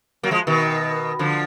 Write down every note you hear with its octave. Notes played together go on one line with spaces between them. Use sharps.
F#3 A#3
F3 G#3
B2 D#3
D3 F3